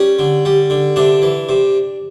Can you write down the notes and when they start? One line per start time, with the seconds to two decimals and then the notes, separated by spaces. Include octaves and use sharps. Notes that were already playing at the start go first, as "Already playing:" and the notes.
Already playing: G3 C#4
0.19 D3
0.45 G3
0.70 D3
0.96 C3 D4
1.22 E3
1.49 C3